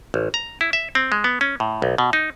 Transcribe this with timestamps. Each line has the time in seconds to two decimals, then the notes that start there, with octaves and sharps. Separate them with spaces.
0.14 A1
0.34 A#5
0.61 E4
0.73 E5
0.95 C4
1.12 G#3
1.24 B3
1.41 C#4
1.60 A2
1.82 B1
1.98 B2
2.13 D#4